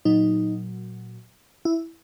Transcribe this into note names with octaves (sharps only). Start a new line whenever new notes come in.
A#2 F#3 D#4
E4